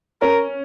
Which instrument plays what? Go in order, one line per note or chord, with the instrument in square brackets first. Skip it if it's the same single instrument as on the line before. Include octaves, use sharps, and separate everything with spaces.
[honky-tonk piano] C#4 [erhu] A#4